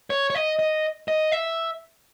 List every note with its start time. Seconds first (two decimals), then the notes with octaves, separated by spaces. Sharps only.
0.10 C#5
0.30 C#5
0.35 D#5
0.59 D#5
1.08 D#5
1.32 E5